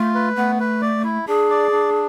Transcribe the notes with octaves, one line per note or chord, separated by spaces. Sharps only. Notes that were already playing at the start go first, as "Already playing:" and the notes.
Already playing: A3 F4
B4
A3 B3
B4
D5
E4
D4 G#4
D5
D4